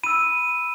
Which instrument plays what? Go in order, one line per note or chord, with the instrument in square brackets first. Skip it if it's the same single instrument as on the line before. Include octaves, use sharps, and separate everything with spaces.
[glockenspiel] B5 E6 D#7